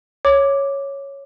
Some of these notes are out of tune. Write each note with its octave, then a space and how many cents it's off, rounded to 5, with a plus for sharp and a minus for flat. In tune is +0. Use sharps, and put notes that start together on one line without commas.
C#5 +0 D6 +0